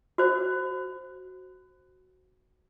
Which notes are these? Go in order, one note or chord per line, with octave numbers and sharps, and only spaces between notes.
F#4 C5